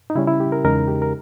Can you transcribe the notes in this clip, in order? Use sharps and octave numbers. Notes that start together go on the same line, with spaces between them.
D#4
C#3 G3 C#4 E4
E4
G4
A#4
E2 C#3 G#3 D#4 A#4
G4
A#4